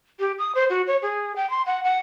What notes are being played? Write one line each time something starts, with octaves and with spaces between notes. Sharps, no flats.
G4
D#6
C5
F#4
C#5
G#4
G5
C6
F#5
F#5